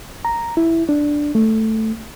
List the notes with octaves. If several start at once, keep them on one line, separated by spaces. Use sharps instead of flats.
A#5
E4
D4
A3